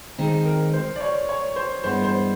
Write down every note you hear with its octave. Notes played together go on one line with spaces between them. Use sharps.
D#3 G#3 C4 D#4
A#4
C5
D5
C#5
C#5
C5
G2 E3 G#3 B3 E4 C5
C5